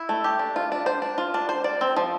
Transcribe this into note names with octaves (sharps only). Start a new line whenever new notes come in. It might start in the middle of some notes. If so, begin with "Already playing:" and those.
Already playing: E4
A3
G4
D4
F4
D4
C5
D4
F4
D4
C5
D5
C4
F3